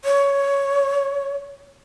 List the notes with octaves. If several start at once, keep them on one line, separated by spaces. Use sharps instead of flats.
C#5